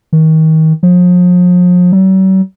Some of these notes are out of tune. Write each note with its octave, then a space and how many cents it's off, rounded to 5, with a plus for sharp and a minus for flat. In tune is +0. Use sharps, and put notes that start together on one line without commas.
D#3 +30
F3 +40
F#3 +45